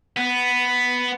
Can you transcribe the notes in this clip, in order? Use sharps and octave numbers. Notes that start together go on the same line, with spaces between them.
B3